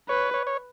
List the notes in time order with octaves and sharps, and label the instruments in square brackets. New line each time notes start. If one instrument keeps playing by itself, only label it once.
[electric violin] B4 [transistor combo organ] C#5
[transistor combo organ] C#5
C#5